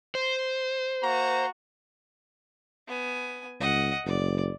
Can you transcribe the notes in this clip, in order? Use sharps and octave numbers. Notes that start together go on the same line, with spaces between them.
C5
A#3 F#4 A#5
B3 G#5
C#2 D#5 F#5
F#1 D5